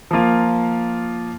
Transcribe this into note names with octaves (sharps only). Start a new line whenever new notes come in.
F3 A#3 F4